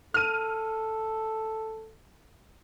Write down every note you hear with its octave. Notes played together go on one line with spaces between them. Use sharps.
A4 F6 D#7